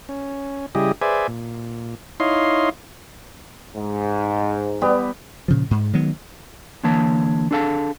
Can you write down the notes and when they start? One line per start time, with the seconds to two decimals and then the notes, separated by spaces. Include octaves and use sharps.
0.09 C#4
0.75 C#3 G3 E4 G4 G#4 D#5
1.02 G#4 B4 C5 D5 E5 G#5
1.28 A#2
2.20 D#4 E4 C#5 D#5 F5 C6
3.76 G#2
4.82 G3 B3 G4
5.48 A#2 C#3 F3
5.71 G#2
5.93 D#3 F#3 G#3 B3
6.84 D3 E3 A#3 C#5 A5
7.51 D4 G#4 A4 F5 A5